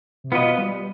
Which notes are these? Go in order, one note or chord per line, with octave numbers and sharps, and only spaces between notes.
C3
B2 B3 F4 B4 D#5
G3